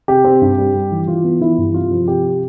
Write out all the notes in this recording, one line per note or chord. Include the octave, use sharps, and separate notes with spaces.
C3 G4
C4
G2
G3
G3
E3
E3 F4
B3
E3 E4
G2
C3 F4
F3
C3 G4